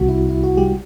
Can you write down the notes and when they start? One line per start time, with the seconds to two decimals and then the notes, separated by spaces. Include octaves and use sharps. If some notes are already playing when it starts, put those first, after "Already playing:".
Already playing: C2 C3 G3 F#4
0.08 E4
0.29 E4
0.44 F#4
0.57 G3 G4